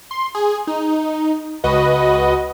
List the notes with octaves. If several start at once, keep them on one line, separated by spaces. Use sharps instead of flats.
C6
G#4
D#4
C#2 F#4 B4 D#5